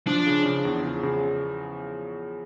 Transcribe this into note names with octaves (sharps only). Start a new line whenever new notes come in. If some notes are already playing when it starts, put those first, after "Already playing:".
F3 D4
C#3
C#3
E2
C#3
C#3